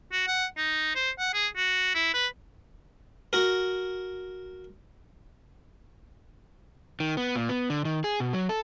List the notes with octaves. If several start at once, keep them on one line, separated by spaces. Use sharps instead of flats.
F#4
F#5
D#4
C5
F#5
G#4
F#4
E4
B4
F#4 A#4
D#3
B3
A#2
B3
D3
D#3
G#4
B2
F#3
A4